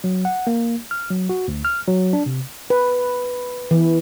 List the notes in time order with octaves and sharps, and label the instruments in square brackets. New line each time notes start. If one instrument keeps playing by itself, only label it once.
[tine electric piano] F#3
F#5
A#3
F6
F#3
F#4
D2
F6
F#3
D4
C3
[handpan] B4
E3